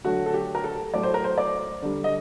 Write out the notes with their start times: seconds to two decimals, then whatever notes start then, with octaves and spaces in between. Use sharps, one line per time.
0.05 D3 F#3 A3 F#4
0.26 A4
0.34 G4
0.55 A#4
0.64 A4
0.93 A2 F#3 A3 D5
1.03 C5
1.14 A#4
1.24 C5
1.38 D5
1.82 D3 G3
2.04 D#5